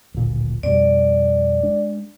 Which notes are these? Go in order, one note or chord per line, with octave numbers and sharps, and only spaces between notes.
D1 G#1 A#2
F2 B2 G3 D5
G#3 D4